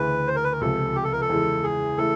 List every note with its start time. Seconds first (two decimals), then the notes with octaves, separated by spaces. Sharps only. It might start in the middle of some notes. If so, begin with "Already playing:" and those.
Already playing: D2 C#3 E3 B4
0.27 C5
0.36 A#4
0.44 B4
0.52 A#4
0.61 C#2 C3 F3 A4
0.95 G4
1.04 A4
1.12 A#4
1.21 A4
1.29 E2 C#3 E3 G#3
1.63 G#4
1.98 C#3 E3 A3 A4